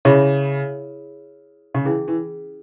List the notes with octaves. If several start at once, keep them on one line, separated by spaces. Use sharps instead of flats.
C#3 E4 G#4 C#5 E5 B5
C#3
E3 C#4 E4 G#4
E3